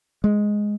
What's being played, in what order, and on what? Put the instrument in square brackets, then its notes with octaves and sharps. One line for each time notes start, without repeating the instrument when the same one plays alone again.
[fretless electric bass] G#3